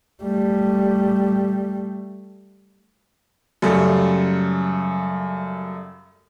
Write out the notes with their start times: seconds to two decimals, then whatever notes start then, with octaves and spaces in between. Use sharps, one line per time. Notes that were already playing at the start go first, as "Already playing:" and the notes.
0.23 G3 A3
3.62 F#2 C#3 G3 A3